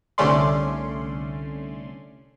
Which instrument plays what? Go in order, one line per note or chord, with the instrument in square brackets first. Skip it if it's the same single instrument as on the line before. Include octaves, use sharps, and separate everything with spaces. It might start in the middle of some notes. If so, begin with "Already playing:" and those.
[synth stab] C2 D3 A3 C#4 D5 C6